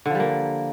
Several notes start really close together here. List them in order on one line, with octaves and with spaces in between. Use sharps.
D3 F3 G3 A#3